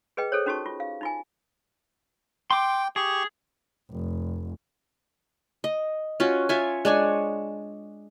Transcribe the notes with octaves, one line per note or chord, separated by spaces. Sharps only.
G#4 B4 D#5 G5
G#4 A4 C5 C#5
C#4 D#4 F#4 G4 A5 C#6
F4
F5
D#4 F4 G#5
G5 C6 D6
G4 G#4 C#6
F1
D#5
C#4 F4 F#4
F4 C#5 E5 G#5
G#3 D4 C#5 G#5